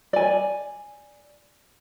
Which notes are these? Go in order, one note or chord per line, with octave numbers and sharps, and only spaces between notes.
D5 G#5